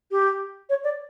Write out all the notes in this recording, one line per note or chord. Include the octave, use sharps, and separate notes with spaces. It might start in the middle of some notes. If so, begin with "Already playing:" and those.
G4
C#5
D5